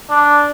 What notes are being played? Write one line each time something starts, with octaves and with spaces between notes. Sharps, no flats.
D4